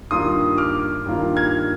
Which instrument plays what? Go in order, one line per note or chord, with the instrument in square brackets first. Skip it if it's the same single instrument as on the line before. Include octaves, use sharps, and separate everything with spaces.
[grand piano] G2 D#3 A#3 F4 C6 D#6
D6 F6
G2 D#3 A#3 F4
F6 G#6